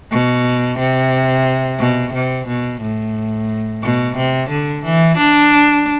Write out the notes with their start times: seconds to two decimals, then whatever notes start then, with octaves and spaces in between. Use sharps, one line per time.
0.11 B2
0.79 C3
1.79 B2
2.14 C3
2.48 B2
2.82 A2
3.83 B2
4.17 C3
4.50 D3
4.85 E3
5.18 D4